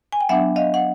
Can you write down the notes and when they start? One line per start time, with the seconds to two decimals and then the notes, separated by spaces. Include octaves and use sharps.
0.12 G#5
0.21 G5
0.29 F#3 B3 D4 E5 F#5
0.56 D#5 F5
0.74 F#5